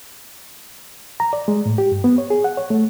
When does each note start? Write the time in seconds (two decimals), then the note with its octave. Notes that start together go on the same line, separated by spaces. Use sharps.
1.20 A#5
1.33 D5
1.48 G#3
1.66 A2
1.78 G4
1.92 G2
2.04 B3
2.18 C#5
2.30 G#4
2.44 F#5
2.57 C#5
2.70 A3